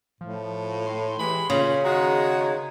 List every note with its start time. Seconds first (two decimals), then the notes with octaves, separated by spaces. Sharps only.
0.21 A2 F3
0.86 C6
1.19 E3 G#3 G4 B5
1.50 A#2 C#3 C#4
1.84 D#3 G#3 F#4 A#5